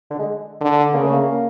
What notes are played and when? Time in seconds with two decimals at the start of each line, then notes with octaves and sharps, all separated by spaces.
0.10 D3
0.19 G#3
0.61 D3
0.93 C#3 A#3
1.03 A3
1.13 A#3